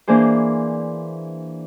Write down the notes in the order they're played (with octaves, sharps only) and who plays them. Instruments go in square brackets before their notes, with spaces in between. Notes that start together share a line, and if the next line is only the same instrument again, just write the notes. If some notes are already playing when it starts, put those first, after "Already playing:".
[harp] E3 A#3 D4 G#4 C5